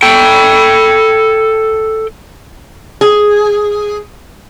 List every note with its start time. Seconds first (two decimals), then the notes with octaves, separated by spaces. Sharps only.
0.03 A4 G5
3.01 G#4